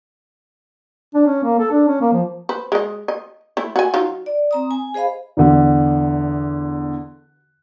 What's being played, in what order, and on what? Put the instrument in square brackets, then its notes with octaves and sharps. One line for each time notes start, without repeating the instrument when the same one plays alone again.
[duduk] D4
C#4
A#3
A4
D4
C#4
A#3
F3
[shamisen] B4 C5
G#3 D#5
D#5
A3 E4
F#4 G#5
F#3 D#4 F4
[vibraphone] D5
C4 A#5 D#6
G#5
G#4 C5 D#5 F5 B5
[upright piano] E2 D3